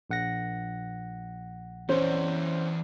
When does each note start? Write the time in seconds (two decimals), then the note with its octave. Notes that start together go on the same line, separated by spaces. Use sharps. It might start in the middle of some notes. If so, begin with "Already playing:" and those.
0.10 A#1 F#5 A#6
1.89 E3 C#4 C5 D5